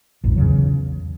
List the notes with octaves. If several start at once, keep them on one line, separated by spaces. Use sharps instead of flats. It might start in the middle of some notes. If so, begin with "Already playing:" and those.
A#1 F2 G#2
E2 C#3 F#3